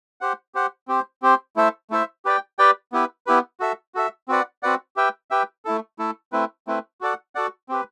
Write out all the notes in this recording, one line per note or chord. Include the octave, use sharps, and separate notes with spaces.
G4 C5 F#5
G4 C5 F#5
C4 G4 C5
C4 G4 C5
A3 E4 A4 C5 E5
A3 E4 A4 C5 E5
G4 B4 D5 G5
G4 B4 D5 G5
B3 E4 G4 B4
B3 E4 G4 B4
F#4 A4 E5
F#4 A4 E5
C4 F#4 B4 D5 F#5
C4 F#4 B4 D5 F#5
G4 B4 E5 G5
G4 B4 E5 G5
A3 E4 A4
A3 E4 A4
A3 C4 E4 B4
A3 C4 E4 B4
F#4 A4 D5 F#5
F#4 A4 D5 F#5
C4 G4 B4